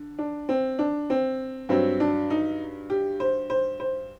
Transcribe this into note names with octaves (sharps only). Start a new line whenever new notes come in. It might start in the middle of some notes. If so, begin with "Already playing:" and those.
Already playing: D3
D4
C4
D4
C4
G2 F#3 C4
D4
D#4
G4
C5
C5
C5